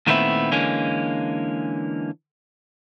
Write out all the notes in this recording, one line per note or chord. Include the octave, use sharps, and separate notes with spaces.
A#2 D#3 A3 B3 C4 E4
D3 E3 G#3 A#3 C#4